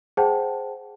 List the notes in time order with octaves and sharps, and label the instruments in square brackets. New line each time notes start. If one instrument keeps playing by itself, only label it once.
[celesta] G#4 C5 F#5 G5 A5